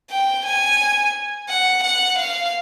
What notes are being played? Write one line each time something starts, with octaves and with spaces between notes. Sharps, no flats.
G5
G#5
F#5
F#5
F5